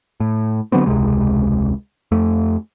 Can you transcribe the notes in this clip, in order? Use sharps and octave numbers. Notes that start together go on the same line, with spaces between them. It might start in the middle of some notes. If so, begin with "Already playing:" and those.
A2
D3 F#3 B3 C4
E1 C#2 C3 G#3
F2 A3